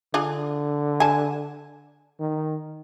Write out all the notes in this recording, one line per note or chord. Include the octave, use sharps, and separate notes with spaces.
D3 D4 F4 G#4
G#5 A5
D#3